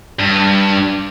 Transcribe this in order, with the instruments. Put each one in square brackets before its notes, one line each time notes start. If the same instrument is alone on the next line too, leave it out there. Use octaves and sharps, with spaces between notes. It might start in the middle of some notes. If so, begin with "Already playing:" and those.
[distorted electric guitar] G2